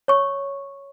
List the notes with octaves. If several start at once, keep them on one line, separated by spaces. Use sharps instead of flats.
C#5 C#6